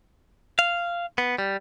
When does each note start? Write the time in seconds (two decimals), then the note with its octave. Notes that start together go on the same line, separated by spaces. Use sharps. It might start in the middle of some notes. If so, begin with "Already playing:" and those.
0.59 F5
1.18 B3
1.38 G3